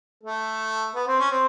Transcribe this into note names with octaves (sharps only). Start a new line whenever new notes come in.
A3 A4
B3 B4
C4 C5
C#4 C#5
C4 C5